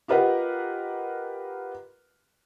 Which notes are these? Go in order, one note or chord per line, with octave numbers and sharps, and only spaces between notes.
F4 G4 A#4 B4 D#5 F#5